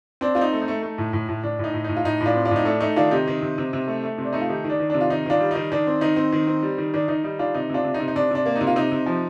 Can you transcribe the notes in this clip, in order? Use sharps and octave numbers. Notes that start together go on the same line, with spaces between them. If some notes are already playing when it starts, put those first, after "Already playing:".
C4 D4
C4 F4
D#4
A3
D#4
A3
A3
A2
A2
A2
A2 D4
A2 D#4
A2
A2 D#4
F4
A2 D#4
A2
D4 F4
C4
D4 F4
A2 D#4
A3 D4
A3 D#4
D#3 D4 F4
C3 D#4 G4
D#3
C3
C3
C3
A3
A3
C3
D4
A3 D#4
F4
D#3 D#4 G4
D#3
D4
D#3
C3 D4
F4
D#3 D#4
D#3 D4 F4
G3
D#3 D#4
D#3 D4
C4
D#3 D#4
C4
D#3
C4
G3
D#3
D#3 D4
D#3 D#4
G3 D#4
D#3 D4 F4
C3 D#4
C3 D4 F4
C3
D#4
C3
D#4
C3 D4
C3 D4
A#3
C3 D#4
F4
C3 D#4
C3
F3